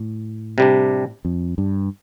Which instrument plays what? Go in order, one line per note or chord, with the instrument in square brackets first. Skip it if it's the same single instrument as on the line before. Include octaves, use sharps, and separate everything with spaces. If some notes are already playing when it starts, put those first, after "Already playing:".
Already playing: [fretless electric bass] A2
[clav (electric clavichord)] C3 G3 D4
[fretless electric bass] F2
G2